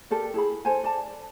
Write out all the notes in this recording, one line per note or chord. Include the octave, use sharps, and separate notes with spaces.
G4 A4 A#4 D5
E4 G#4 B5
A4 C5 G#5
D5 A5